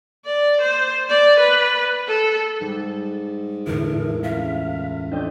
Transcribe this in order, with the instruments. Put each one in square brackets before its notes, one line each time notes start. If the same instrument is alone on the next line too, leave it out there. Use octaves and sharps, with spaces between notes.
[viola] D5
C5
D5
B4
A4
[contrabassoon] G#2 [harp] G3
[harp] E2 A2 [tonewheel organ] D3 E4 [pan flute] A#4
[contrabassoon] C#2 [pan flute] E5 [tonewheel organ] F5
[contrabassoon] F2 [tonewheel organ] C#4 D4 G5 [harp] A4 C5 D#5